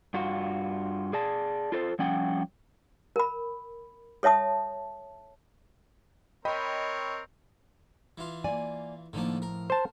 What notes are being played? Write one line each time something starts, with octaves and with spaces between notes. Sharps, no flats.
G2 F4 F#4
G#4 D5 A5
F4 A4 C5
F3 G3 C#4 F#5 G5
A#4 B5
A4 C#5 E5 A5 D#6
C4 A#4 C#5 D#5 G5 B5
E3 F4
A#3 D5 G#5
A2 D3 D#3 F3 A#3
A#4
C5 A5